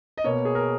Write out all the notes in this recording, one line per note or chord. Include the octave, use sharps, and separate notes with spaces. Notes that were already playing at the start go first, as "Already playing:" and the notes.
D#5
B2 A#3 C#5
G#4
A#4